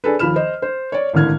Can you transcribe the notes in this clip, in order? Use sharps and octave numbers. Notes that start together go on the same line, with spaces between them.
D4 G#4 A4 B4
D#2 F3 B5 F6 E7
C5 D#5
C5
C#5 D5
G#1 A2 D3 F6 G#6